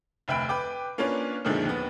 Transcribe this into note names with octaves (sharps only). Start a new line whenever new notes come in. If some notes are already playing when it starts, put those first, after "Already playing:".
F1 D2 E5 G5 B5 D7
B4 G5 D6
A#3 C#4 D4 F4 B4 C#5
F#2 A#2 D3 D#3 F3 G#3
D#2 B3